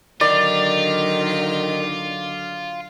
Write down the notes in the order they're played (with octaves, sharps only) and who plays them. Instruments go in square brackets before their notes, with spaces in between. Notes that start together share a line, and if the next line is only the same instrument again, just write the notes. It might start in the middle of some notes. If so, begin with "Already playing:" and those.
[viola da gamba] D3 F#3 [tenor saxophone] D#3 [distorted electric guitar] F4 [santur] D5